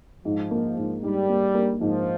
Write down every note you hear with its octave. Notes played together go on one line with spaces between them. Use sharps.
G#2 F3
A#3
G#2
G#2 G3
A#3
A#3
G#2 F3